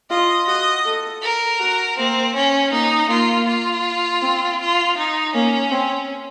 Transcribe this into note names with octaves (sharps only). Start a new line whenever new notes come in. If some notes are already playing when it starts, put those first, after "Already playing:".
F4 D#5
F#4 D#5
A4
A#4
F#4
A#3 C4
C#4
A#3 D#4
A#3 F4
F4
C4
F4
D#4
A#3 C#4
C4